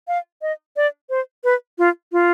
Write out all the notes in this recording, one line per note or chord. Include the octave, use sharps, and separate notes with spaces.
F5
D#5
D5
C5
B4
F4
F4